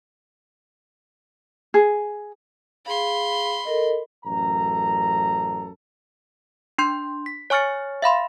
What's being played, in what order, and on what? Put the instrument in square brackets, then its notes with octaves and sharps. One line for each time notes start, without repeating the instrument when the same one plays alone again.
[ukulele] G#4
[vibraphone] G#4 F5 [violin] B5 C6
[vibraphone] A4 A#4 D#5
[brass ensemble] A1 F#2 A4 A#5
[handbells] D4 C6 G6
B6
C#5 G#5 C#6 F6 A6 C#7
E5 F5 B5 C6